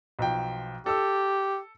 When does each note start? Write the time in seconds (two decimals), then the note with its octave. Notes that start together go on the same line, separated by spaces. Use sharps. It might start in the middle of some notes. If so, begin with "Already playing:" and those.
0.19 B1 F3 G5
0.86 G4 A4 E6